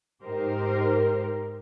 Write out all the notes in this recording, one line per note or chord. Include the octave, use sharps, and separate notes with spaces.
G#2 D#4 G4 A#4 C5